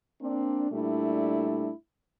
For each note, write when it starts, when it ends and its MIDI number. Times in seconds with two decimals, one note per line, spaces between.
0.22 0.69 58
0.22 0.69 60
0.22 0.69 62
0.72 1.71 46
0.72 1.71 55
0.72 1.71 57
0.72 1.71 62
0.72 1.71 64